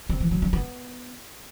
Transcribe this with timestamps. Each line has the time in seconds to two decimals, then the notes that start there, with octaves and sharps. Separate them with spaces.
0.09 C4
0.20 E3
0.31 F#3
0.42 C#4
0.53 B3